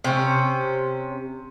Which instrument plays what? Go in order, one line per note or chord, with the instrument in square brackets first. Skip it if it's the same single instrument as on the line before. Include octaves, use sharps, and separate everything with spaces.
[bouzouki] C3 C#4